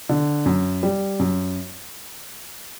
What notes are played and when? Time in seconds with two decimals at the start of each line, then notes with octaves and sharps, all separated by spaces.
0.09 D3
0.46 F#2
0.83 G3
1.19 F#2